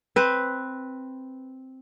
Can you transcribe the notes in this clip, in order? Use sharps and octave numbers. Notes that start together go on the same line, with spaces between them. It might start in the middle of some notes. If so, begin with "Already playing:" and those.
C4 B4